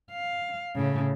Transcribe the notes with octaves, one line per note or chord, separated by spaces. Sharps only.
F5
A2 C#3